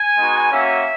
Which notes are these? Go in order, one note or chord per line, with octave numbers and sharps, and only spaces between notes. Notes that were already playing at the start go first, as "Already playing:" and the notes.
Already playing: G#5
G#3 B3 D#4 F#4
A#3 C#4 F#4 E5